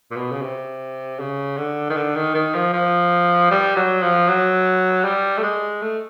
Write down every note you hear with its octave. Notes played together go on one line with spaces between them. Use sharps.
A#2
B2
C#3
C3
C#3
D3
D#3
D3
D#3
D#3
F3
F3
G3
F#3
F3
F#3
G3
A3
G#3
A3